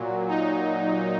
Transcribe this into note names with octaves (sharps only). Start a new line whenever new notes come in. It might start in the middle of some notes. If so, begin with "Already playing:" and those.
Already playing: A#2 F#3
D#4